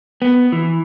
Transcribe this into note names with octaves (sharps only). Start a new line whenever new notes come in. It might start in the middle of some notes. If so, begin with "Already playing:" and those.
B3
E3